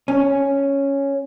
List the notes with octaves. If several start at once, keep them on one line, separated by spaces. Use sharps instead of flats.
C#4